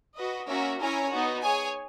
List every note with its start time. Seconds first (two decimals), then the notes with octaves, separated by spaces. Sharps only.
0.17 F#4 B4 D#5
0.47 A#3 C#4 F#4 A#4 E5
0.79 C#4 E4 A#4 C#5 G#5
1.11 B3 D#4 F#4
1.42 G#4 C#5 G#5